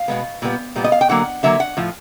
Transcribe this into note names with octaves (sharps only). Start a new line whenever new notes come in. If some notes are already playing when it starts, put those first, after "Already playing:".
Already playing: F5
B2 G#3 B3
A#2 G3 B3
A#2 G3 B3
D#5
F5
G5
D3 F#3 A#3 F#5
D3 F#3 A#3 E5
F#5
A2 F3